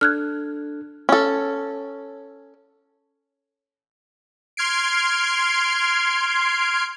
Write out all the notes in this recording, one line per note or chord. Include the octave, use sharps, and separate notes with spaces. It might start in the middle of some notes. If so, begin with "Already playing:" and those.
D4 A4 F6 F#6 G#6
C#4 A4
C6 F6 G#6 C7 D7